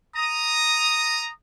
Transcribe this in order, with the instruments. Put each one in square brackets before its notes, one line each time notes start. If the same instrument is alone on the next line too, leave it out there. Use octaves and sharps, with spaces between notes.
[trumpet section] A#5 D#6